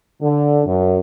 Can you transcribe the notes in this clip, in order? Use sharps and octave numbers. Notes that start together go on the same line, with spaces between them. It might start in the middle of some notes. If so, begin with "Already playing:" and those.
D3
F#2